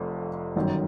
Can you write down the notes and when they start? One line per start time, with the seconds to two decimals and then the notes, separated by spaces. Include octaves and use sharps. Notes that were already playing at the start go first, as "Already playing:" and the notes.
Already playing: F1 F2 C3
0.56 G1 F#2 D#3